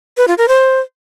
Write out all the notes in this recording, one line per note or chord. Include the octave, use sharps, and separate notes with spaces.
B4
F4
A#4
C5